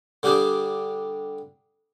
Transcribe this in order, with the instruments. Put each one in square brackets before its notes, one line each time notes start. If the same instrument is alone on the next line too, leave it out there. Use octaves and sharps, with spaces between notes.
[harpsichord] D3 G3 D4 G4 G#4